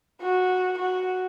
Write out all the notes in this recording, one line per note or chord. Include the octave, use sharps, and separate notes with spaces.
F#4
F#4